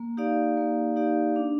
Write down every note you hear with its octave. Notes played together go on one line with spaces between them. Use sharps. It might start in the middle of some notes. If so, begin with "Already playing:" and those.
Already playing: A#3
D#4 G4 D5 F5
A#3
D#4 G4 D5 F5
D4